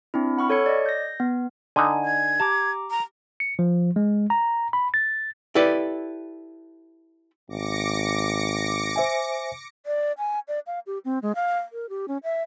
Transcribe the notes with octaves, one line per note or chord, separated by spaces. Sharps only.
C4 D4 E4
F#5 B5 C#6 F6
A4 C#5 G#6 C#7
D5 D#5
G6 A#6
B3
D3 D#4 G#5
G#6
G4 A5 A#5 D6
A#5
C#7
F3
G#3
A#5
B5
A6
E4 G4 A4 B4 D5
G#1 D6 A#6 C#7
C5 E5 G#5
D5
G#5
D5
F5
G4
C4
G#3
F5
A#4
G4
C#4
E5